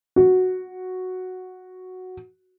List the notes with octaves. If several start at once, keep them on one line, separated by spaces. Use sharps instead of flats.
F#4